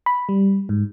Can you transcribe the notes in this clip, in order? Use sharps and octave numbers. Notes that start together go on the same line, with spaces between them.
B5
G3
G#2